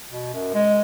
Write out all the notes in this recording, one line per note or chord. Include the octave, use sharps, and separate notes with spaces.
B2
F#2
G#3